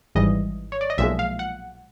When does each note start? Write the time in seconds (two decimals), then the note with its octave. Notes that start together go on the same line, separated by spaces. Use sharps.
0.15 G#1 G#2 E3 G3 D#5
0.72 C#5
0.81 D5
0.90 D#5
0.98 B1 A#2 F3 G#3 E5
1.19 F5
1.39 F#5